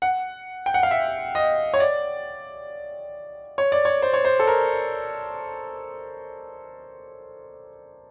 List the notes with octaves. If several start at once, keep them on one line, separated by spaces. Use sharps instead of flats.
F#5
G5
F#5
F5
E5
D#5
C#5
D5
C#5
D5
C#5
C5
C#5
C5
A4
A#4